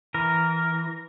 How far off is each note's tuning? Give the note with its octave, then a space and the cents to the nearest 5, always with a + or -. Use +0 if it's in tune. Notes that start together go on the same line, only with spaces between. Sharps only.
E3 -5 A#4 +0